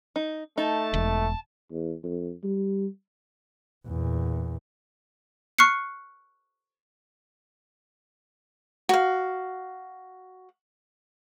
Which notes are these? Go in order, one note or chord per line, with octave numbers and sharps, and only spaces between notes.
D#4
A3 D#4 A5
E1
E2
F2
G3
E2 A#2
C#6 F6 F#6 C7 C#7
F#4 F5